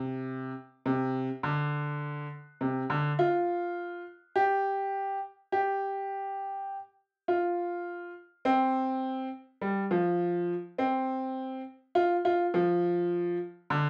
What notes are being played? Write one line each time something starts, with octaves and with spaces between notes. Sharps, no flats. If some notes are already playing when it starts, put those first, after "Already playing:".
Already playing: C3
C3
D3
C3
D3
F4
G4
G4
F4
C4
G3
F3
C4
F4
F4
F3
D3